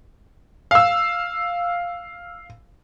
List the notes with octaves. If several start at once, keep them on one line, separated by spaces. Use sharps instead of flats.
F5 E6